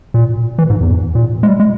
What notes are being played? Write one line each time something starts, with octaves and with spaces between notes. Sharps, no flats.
A#2
E3
G#2
E2
A#2
G#3
G3
G#3